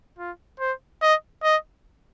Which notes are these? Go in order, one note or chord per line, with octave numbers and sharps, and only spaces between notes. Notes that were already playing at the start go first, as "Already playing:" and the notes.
F4
C5
D#5
D#5